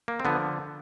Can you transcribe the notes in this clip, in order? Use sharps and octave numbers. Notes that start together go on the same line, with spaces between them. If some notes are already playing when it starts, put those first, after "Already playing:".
A#3
C4
D3 F3 B3